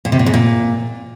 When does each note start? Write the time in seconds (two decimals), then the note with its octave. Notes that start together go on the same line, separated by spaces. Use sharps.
0.05 A#2
0.12 C3
0.19 A#2
0.26 G#2
0.34 A#2